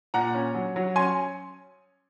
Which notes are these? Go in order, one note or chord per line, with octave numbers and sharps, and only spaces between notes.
A#2 F#5 A#5
C#4
F#3
F#3
C#4 G#5 C6